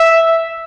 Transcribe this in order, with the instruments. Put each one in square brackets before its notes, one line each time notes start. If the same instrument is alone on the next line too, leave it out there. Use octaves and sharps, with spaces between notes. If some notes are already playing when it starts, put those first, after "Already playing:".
Already playing: [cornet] E5